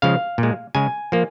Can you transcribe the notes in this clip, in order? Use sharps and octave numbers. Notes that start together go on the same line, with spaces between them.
C#3 F3 G#3 F5
A#2
G#3
C#3 G#3 G#5
F3 A#3